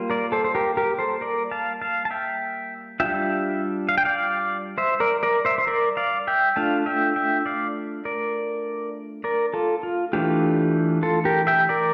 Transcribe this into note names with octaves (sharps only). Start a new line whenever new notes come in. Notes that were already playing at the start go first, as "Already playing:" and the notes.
Already playing: G3 A#3 F4
A#4 D5
A4 C5
C5
G4 A#4
G4 A#4
A4 C5
A#4 D5
F5 A5
F5 A5
A5
E5 G5
G3 D4 F4 E5 G5
F5
G5
D5 F5
C5 E5
A#4 D5
A#4 D5
C5 E5
C5
A#4 D5
D5 F5
E5 G5
A3 D4 F4 F5 A5
E5 G5
E5 G5
D5 F5
A#4 D5
A#4 D5
F4 A4
F4
E3 A3 D4 F4 G4
F4 A4
G4 A#4
E5 G5
A#4 D5